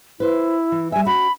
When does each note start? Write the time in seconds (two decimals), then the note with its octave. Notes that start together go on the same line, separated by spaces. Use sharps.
0.20 E4 B4 C5
0.72 E3
0.92 G3 E5 G#5
1.06 C#4 F#4 B5